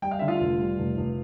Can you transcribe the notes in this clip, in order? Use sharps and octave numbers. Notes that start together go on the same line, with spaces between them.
G3 G5
F5
D3 E5
F4 F5
F1
G3
F1
F1